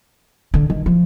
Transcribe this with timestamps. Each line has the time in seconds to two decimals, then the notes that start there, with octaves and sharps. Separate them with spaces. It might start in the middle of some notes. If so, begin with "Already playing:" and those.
0.54 D3
0.70 D#3
0.86 F3